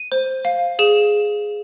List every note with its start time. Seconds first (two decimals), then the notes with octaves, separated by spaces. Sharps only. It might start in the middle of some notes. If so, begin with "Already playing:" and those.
Already playing: D#7
0.12 C5
0.45 F5
0.79 G#4 E7